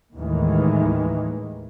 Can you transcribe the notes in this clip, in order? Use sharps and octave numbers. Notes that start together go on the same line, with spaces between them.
D#2 A2 D#3 E3 G#3